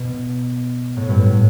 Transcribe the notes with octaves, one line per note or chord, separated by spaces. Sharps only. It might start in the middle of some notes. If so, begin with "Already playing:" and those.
Already playing: B2
A2
G2
A2